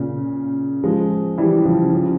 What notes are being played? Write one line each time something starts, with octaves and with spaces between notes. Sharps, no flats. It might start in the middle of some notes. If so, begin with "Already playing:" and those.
Already playing: A#2 C#3
F3 G#3
E3 G3
C#3 F3
C#3 F3